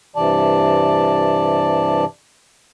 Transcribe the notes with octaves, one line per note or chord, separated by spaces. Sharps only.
G2 C3 E3 D5 A5